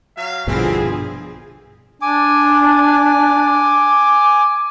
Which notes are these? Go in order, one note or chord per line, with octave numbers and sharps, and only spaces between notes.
F#3 F5
A#1 G2 B2 D3 E3 F3 C4 G#4
D4 G#5 D6